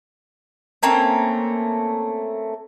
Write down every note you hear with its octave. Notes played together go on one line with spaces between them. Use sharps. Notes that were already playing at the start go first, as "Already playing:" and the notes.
A3 A#3 C4 C#4